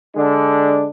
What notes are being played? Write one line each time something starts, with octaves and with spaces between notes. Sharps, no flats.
D3 G#3 D4